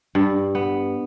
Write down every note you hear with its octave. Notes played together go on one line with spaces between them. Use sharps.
G2
B3